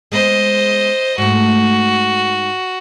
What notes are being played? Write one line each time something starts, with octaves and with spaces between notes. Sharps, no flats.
G#3 B3 C5 D#5
G#2 A3 F#4